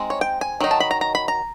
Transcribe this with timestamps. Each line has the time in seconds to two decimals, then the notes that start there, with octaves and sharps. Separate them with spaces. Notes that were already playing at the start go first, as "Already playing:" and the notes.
Already playing: G#3 C4 D#4
0.10 C#5
0.21 G5
0.41 G#5
0.60 D#3 F#3 D#4
0.71 A5
0.80 B5
0.91 A#5
1.01 A#5
1.15 B5
1.28 A#5